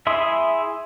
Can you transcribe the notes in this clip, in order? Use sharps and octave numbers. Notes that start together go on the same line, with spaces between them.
E4 G#4 E5 C6 D#6